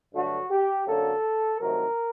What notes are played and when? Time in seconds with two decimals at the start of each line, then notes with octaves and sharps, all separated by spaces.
0.13 G2 D3 F#3 A3 F#4
0.51 G4
0.86 F#2 D3 F#3 A#3 A4
1.58 C2 C3 D#3 F#3 A3 A#4